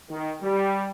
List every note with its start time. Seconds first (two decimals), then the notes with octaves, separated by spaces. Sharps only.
0.10 D#3
0.42 G3